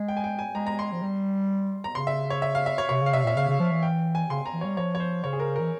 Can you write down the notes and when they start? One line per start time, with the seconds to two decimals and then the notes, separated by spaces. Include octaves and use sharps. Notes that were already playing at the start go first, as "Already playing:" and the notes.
Already playing: G#3
0.08 G5
0.17 G#5
0.24 G5
0.39 G#5
0.55 G#3 A#5
0.67 A#5
0.79 C6
0.92 F3
1.02 G3
1.84 A#5
1.95 C#3 C6
2.07 E5
2.30 C#5
2.42 E5
2.55 F5
2.66 E5
2.78 C#5
2.89 C3 C#5
3.01 C#3
3.06 F5
3.13 C3 E5
3.24 A#2 E5
3.36 C#3 F5
3.48 C#3
3.60 F3
3.72 E3
3.83 G5
4.15 G#5
4.30 C#3 C6
4.46 A#5
4.53 E3
4.61 G3 C#5
4.77 F3 C#5
4.95 C#5
5.00 C5
5.24 C#3 C#5
5.33 G#4
5.40 A#4
5.56 E3 A#4